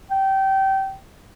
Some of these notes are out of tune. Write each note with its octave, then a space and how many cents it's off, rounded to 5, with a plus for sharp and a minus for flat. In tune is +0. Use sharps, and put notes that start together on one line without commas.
G5 -25